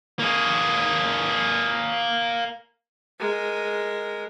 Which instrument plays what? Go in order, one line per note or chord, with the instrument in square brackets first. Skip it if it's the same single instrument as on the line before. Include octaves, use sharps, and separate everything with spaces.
[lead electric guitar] A#3 G#4
[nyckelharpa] G#3 A#4